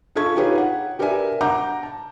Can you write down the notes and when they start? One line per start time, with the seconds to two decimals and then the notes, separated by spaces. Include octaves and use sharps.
0.16 F4 G#4 A4 C#6 G#6
0.36 D#4 F4 G4 G#4 B4 C#5
0.58 F#5
0.99 G4 A#4 B4 D5 E5 G#5
1.41 F#5 A#5 D6 G6
1.83 A5